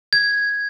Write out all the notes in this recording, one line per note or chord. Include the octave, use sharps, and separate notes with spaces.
G#6